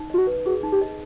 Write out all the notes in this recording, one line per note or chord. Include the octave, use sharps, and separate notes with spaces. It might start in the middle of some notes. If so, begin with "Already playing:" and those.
Already playing: D#4
F4 D#5
F#4
B4
F#4 G#4
D#4
G4
D#5